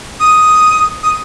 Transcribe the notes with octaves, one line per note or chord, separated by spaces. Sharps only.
D#6
D#6